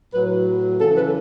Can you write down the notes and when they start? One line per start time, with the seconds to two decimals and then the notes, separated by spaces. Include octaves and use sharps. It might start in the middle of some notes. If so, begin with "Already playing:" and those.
0.14 A2 F#3 B4
0.81 C#3 E3 A4
0.97 B4